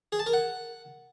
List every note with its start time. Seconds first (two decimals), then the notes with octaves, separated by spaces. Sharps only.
0.12 G#4
0.19 A5
0.26 A#4
0.33 F#5